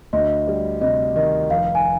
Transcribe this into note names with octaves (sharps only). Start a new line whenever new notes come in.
D2 D#5
G3
C3 D#5
D#3 D#5
F1 F5
G#5